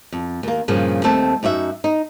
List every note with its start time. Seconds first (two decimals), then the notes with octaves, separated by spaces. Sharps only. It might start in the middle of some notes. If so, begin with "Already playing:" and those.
0.12 F2
0.43 D#2 A#3
0.68 G2 A#2 C#3 F3
1.04 D#2 A3 C4 A5
1.43 F#2 D#4 F#4 E5
1.84 D#4